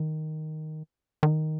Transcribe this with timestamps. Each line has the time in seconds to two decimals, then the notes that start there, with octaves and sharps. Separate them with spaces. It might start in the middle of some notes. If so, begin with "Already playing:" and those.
Already playing: D#3
1.23 D#3